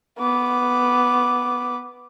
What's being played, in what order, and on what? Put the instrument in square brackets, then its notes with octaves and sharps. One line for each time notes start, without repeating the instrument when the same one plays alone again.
[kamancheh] B3 D6